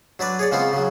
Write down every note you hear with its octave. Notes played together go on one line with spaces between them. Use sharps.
F#3 D4 B4 D5
G#4 C#5 D5
C#3 F3 G#3 B3 C4 F4
C#3 F#3